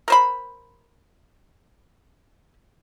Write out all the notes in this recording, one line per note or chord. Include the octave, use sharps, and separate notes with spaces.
A#4 C5 B5